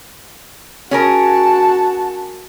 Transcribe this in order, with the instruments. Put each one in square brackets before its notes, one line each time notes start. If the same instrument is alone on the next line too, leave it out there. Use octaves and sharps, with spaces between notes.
[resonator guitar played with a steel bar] C#4 G#4 A#4 [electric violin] F#4 A5